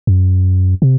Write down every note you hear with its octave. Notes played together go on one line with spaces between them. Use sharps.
F#2
C3